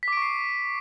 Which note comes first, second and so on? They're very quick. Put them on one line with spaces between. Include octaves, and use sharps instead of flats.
B6 D6 D7 C#6 C7